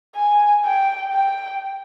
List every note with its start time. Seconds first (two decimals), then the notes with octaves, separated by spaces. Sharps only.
0.15 G#5
0.65 G5
1.13 G5